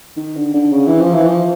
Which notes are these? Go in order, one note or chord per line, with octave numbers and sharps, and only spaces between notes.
D#3
D3
D3
C#3
E3
F3
E3
F3